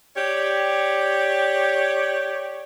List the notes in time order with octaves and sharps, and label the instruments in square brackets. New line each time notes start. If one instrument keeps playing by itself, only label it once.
[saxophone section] G4 C#5 D5